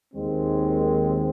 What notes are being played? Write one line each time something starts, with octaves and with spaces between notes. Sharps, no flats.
D#2 D#3 G#3 C4